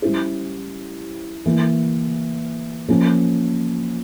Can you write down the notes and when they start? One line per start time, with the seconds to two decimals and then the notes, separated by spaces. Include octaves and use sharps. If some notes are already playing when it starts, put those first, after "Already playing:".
0.02 G3 C#4 E4 G4 C5
1.46 E3 A#3 E4
2.89 F3 A#3 C#4